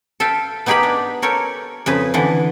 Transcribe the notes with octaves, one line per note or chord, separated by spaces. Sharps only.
A4 E5 F5 G5
B3 D#4 G4 G#4 A#4 B5
D4
A4 A#4 C#5 G5
F2 C#3 G#4 B4
D3 E3 B4